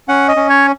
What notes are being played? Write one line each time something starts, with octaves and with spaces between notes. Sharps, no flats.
C#4 F#5
D#5
C#4
C#5